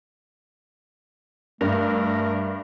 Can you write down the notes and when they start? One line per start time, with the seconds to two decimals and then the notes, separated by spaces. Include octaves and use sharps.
1.61 G2 A3 A#4